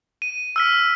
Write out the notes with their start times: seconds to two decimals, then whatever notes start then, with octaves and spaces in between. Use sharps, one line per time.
0.22 D#7
0.56 E6 F6 B6